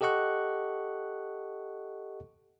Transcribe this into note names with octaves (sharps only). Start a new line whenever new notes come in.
G4 A4 D#5 F#5 C#6 F#6